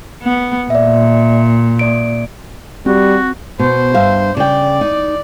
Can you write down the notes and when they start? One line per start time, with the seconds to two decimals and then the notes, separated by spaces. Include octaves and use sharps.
0.22 B3
0.70 A#2 D5 E5
1.79 A#3 D5 D7
2.86 G3 C4 F#4
3.59 B2 C5
3.94 G2 E5 F5
4.37 C#3 D5 G5
4.81 D#4